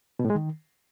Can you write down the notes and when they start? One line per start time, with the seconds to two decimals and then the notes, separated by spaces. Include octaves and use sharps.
0.19 B2
0.25 A2
0.30 G#3
0.35 D#3